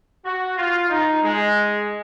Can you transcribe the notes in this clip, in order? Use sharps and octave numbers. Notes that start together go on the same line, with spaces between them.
F#4
F4
D#4
G#3